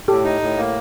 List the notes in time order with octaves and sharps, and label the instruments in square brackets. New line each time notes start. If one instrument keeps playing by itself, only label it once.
[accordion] A2 [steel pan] G4 A4
[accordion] D#4
A2
A#3